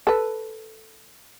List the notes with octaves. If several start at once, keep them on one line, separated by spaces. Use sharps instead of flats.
A4 B4